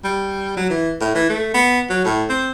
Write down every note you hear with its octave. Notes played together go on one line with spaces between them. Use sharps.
G3
F#3
E3
A2
E3
A3
B3
F#3
A2
C4